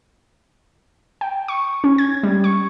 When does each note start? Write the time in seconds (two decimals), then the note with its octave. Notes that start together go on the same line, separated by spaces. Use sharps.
1.21 G5
1.48 C#6
1.84 C#4
1.98 G#6
2.23 G3
2.44 C#6